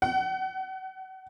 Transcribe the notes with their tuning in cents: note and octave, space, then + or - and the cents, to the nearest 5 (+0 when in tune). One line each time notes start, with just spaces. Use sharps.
F#5 +35